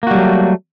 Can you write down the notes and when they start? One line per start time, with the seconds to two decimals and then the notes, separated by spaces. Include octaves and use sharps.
0.03 A#3
0.07 F#4
0.11 G3
0.15 F#3
0.19 A3